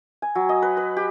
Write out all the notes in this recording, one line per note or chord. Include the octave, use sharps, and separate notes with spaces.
G#5
F#3
D#5
B4
B4
G4